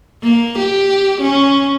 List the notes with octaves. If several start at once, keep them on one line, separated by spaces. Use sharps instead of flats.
A#3
G4
C#4